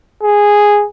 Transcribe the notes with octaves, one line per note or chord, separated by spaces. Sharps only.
G#4